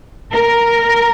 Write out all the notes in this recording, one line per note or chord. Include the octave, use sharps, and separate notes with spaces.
A#4